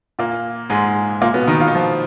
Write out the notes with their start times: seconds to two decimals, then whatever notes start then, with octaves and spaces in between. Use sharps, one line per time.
0.19 A#2 A#3
0.70 G#2 G#3
1.21 A#2 A#3
1.34 B2 B3
1.47 D#3 D#4
1.60 F4
1.67 D#4
1.75 F3 F4